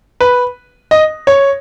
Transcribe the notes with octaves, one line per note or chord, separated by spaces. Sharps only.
B4
D#5
C#5